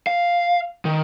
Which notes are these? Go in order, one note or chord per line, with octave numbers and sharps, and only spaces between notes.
F5
D#3